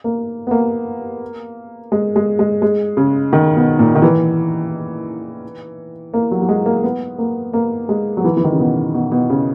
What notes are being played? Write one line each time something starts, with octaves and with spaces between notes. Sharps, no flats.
A#3
B3
A#3
G#3
G#3
G#3
G#3
C#3
D#3
B2
A#2
D#3
E3
A#3
F#3
F#3
G#3
A#3
B3
A#3
A#3
G#3
F#3
E3
E3
D#3
C#3
B2
B2
B2
C#3